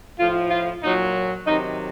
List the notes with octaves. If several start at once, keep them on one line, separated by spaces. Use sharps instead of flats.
A2 F3 F4
F4
A#2 F#3 D#4
C3 D#3 F#3 D#4